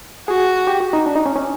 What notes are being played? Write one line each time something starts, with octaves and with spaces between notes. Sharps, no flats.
F#4 G#4
G4
F#4
D#4
D4
D#4
C#4
C#4